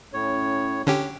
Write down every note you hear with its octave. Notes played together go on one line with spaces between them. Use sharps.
A2 C#4 C#5
D3 C#4 G4